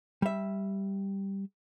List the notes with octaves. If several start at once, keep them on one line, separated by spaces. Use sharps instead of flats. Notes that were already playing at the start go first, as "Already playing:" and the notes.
G3 E5